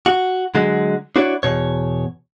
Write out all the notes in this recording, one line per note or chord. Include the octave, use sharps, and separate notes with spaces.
F#4
D3 F#3 G#3
D4 E4 F#4 C#5 D5
E2 G2 B2 C#5